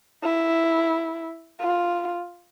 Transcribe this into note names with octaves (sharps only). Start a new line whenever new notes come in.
E4
F4